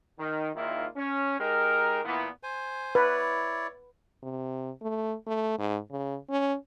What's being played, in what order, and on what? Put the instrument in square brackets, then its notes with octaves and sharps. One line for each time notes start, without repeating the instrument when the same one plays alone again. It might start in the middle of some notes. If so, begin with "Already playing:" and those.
[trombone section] D#3
G#1 A#2 D#3 A#3 E4 F4
C#4
G#3 D#4 G4 A#4
A#2 E3 B3
[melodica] C5 G#5
[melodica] E4 C#5 D5 [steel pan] B4
[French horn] C3
A3
A3
G#2
C#3
C#4